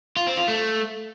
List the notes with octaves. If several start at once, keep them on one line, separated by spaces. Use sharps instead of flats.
F4
C4
F4
A3